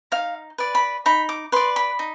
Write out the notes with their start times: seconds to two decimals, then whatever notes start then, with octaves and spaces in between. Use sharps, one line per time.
0.12 D#4 F5
0.58 B4 D5
0.75 B5
1.06 D#4 B5
1.29 D6
1.52 B4 D5 C6
1.76 B5
1.99 D#4